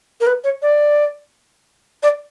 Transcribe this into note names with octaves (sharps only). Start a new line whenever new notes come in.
A#4
B4
C#5
D5
D5